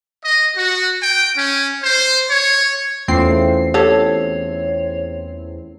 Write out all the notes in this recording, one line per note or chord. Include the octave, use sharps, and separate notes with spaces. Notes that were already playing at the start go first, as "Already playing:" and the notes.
D#5
F#4
G5
C#4
C5
C#5
E2 A3 C4 C#4 F4 C7
G4 A4 C#5